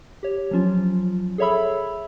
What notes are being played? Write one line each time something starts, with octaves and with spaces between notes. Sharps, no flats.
G4 C#5
F3 F#3 C#4 F4
G#4 A4 C#5 E5 B5 E6